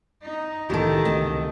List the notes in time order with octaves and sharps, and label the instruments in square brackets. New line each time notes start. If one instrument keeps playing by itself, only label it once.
[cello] D#4
[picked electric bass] C2 A2 E3 [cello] D#3 [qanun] G4 A4
[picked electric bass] C#2 C3 A3 [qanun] D#5 A5